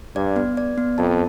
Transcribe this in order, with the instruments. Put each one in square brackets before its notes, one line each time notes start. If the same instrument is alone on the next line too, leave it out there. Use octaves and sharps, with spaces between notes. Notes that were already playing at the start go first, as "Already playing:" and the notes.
[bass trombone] G2 [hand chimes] D5
[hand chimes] B3
D5
B3
[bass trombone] F2 [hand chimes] A5